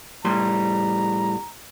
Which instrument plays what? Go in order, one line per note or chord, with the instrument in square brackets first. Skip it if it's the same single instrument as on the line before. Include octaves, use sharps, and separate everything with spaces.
[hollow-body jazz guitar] A2 G3 C6 [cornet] A#5